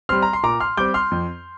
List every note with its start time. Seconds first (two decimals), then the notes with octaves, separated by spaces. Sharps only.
0.09 G3 C4 C6 F6
0.22 A#5
0.33 C6
0.43 A#2 A#5 D6
0.60 C6 F6
0.77 G3 C4 D6 G6
0.94 C6 F6
1.11 F2